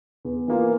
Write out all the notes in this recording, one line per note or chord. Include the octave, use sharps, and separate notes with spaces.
E2
E3 A#3 F4